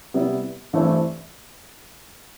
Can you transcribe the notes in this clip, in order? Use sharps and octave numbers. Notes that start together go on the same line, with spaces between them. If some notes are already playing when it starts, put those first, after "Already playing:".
C3 G3 B3 E4
G2 E3 A3 C4 E4